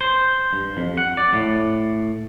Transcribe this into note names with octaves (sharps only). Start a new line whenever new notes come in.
C5
G2
F2
F#5
D5
A2